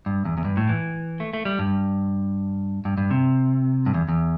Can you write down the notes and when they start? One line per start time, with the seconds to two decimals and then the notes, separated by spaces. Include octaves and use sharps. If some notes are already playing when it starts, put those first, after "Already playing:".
0.06 G2
0.25 E2
0.37 E2
0.45 G2
0.57 A2
0.69 E3
1.20 A3
1.34 A3
1.45 G3
1.59 G2
2.85 G2
2.98 G2
3.11 C3
3.86 G2
3.94 E2
4.09 E2